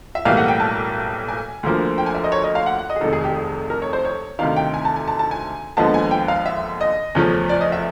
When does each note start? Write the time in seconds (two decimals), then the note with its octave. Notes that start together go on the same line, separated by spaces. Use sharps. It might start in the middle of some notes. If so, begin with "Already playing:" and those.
0.15 E5
0.25 B1 A2 E3 G3 A#3 F5
0.37 F#5
0.48 G5
0.60 A5
1.28 G#5
1.63 D2 D3 F3 A#3
1.98 G5
2.06 G#5
2.14 E5
2.24 D#5
2.32 C#5
2.44 D#5
2.55 F5
2.66 F#5
2.79 F#5
2.90 D#5
2.96 G#4
3.01 F1 F2 C3 D#3 A4
3.13 G#4
3.24 G4
3.36 G#4
3.70 A#4
3.82 C#5
3.93 C5
4.05 C#5
4.39 D2 C3 D#3 F5
4.56 G5
4.74 G#5
4.85 A5
4.96 G#5
5.08 A5
5.19 A5
5.31 G#5
5.77 D#2 D3 F3 G#3 B3 A5
5.94 G#5
6.11 G5
6.28 F5
6.46 E5
6.81 D#5
7.15 E2 C#3 F3 A3 C#4
7.49 D5
7.61 D#5
7.72 E5